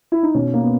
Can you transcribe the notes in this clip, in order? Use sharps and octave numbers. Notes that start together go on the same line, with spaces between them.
E4
D#4
B2 C#4
A#3
B3